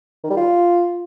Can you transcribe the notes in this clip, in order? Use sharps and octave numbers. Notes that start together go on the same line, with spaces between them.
D#3
G3
F4